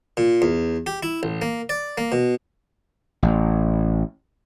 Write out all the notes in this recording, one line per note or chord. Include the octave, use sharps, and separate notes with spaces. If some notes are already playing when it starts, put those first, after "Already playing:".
A#2
E2
G4
E4
A1
A#3
D5
A#3
B2
A1